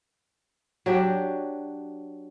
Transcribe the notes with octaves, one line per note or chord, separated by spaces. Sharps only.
F#3 D4 G4